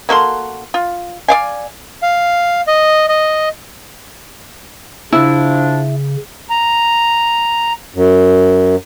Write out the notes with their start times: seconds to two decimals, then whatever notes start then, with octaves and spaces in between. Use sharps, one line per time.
0.09 A#3 F#4 A4 C6
0.74 F4
1.28 D5 F5 G#5
2.02 F5
2.67 D#5
3.08 D#5
5.13 C#3 F3 D4 E4
6.50 A#5
7.95 F#2